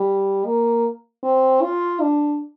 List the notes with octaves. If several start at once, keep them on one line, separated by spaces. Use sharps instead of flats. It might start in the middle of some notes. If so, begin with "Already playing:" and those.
Already playing: G3
A#3
C4
F4
D4